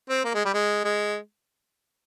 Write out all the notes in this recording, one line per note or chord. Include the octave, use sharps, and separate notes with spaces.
C4
A#3
G#3
G3
G#3
G#3